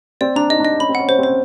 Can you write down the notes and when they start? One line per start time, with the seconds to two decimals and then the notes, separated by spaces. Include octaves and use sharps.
0.21 C4 D5
0.36 D4 A#5
0.50 D#4 D#5
0.60 D4
0.65 D#5
0.79 C#4 B5
0.89 C4
0.95 C#4 F#5
1.08 C#4 C5
1.18 C4
1.23 C#4 C5